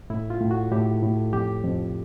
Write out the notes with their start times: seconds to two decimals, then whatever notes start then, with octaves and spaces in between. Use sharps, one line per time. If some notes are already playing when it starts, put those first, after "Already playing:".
0.10 A2 E4
0.30 F4
0.41 A2
0.51 F#4
0.71 A2 G4
1.02 A2
1.33 F2 G4
1.65 F2